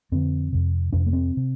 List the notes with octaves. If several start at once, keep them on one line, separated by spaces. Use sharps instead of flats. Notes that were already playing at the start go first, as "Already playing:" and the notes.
F2 D3 C4
F2 C3
F2 C3 D4
A#3
C4
C3